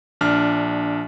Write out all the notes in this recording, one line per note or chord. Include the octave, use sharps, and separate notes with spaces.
A#1 D4 F6